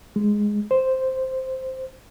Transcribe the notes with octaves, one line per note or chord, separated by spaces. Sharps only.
G#3
C5